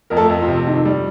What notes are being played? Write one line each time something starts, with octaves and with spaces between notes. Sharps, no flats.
F2 A#4
A3 A4
F2
F4
C3
D#3
G3